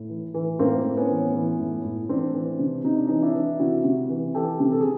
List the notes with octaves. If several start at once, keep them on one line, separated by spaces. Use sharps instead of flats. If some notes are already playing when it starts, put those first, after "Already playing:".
Already playing: A2
E3
E3
A2 A#3 C4
A2
B3 C#4
E3
E3
A2
A2
E3 C4 D4
E3
C3
C3 D#4
D4
E3 C#4 D#4
D4 E4
E3
C3 E4 F#4
C3
E3
E3 G4 A4
C3
A4
G#4